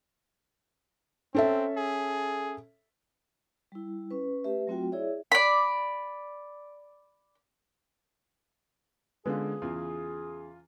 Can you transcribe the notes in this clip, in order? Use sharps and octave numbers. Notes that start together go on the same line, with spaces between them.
C4 C#4 A4 E5
G#4
G3 E4
C#4 B4
A3 G4 B4 E5
F#3 A3 C4 F4 F#4 G5
E4 G#4 C#5 D5 E5
D5 B5
D3 G#3 B3 C#4 F4 G#4
E2 C#3 F4